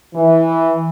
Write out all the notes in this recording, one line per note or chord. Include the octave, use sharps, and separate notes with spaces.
E3